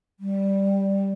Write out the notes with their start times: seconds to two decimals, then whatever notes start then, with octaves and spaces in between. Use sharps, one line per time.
0.20 G3